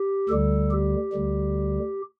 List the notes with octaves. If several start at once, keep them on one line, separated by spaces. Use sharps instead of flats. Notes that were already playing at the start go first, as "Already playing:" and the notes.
Already playing: G4
D2 D3 G3 A4
G4
D2 D3 G3